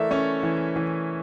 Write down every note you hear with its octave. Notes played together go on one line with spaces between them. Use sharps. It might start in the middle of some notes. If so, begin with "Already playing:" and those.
Already playing: E3 A3 A#4 D5 E5
C#4 C#5
E3
E3